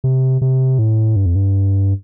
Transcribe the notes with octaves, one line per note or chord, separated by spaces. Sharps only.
C3
C3
A2
G2
F2
G2